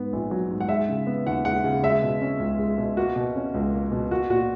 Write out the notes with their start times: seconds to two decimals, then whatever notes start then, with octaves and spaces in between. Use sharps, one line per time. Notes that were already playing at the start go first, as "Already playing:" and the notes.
Already playing: G#2 B3
0.13 A#1
0.31 F#3
0.51 G#2
0.61 F#5
0.69 G#3 E5
0.89 C#3
1.07 B3
1.26 D#2 F#5
1.45 G#3 F#5
1.64 C#3
1.83 G#3 E5
2.02 B2
2.22 C#4
2.40 C#2
2.59 G#3
2.78 B2
2.97 A#3 F#4
3.16 B2
3.36 C#4
3.54 C#2
3.73 A#3
3.92 B2
4.11 A#3 F#4
4.30 A#2 F#4